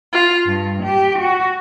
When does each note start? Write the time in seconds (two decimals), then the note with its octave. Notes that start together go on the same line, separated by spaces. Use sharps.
0.12 F4
0.46 G2
0.83 G4
1.17 F#4